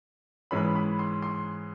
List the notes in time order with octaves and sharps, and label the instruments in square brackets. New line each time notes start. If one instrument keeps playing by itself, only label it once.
[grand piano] G#2 E3 G#3 C#4 B5
B5
C6
C6